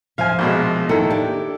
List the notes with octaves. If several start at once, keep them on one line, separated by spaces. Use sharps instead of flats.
F3 E5 F5 G#5
A#1 B2 G#3
D#3 A#3 E4 A4
D4 G4